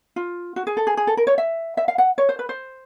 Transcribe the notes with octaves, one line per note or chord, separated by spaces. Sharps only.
F4
F#4
G#4
A4
G#4
G#4
A4
A#4
C#5
E5
E5
F5
F#5
C#5
C5
B4
C5